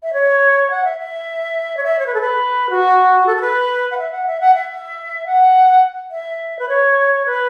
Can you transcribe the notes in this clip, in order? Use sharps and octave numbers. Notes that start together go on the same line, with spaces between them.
E5
C#5
F#5
E5
E5
C#5
E5
C#5
B4
A4
B4
F#4
A4
A4
B4
F#5
E5
F#5
E5
F#5
E5
F#5
E5
B4
C#5
B4